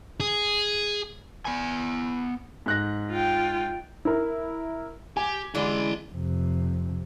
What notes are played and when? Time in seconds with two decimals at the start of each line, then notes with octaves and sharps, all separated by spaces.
0.20 G#4
1.45 B3 B4 G#5
2.66 G#2 F#6 A#6
3.10 F4 G5
4.05 E4 A#4
5.17 G4 G#5
5.55 D3 E3 G#3 D4 E4 C6
6.13 F2 C3